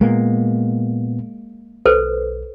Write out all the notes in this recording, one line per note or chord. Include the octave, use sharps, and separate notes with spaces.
A#2 G#3 A#3 B3
B1 A4 B4 C5